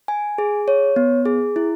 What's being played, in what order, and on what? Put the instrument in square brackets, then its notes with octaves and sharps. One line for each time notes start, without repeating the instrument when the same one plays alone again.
[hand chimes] G#5
G#4
C#5
B3
G#4
E4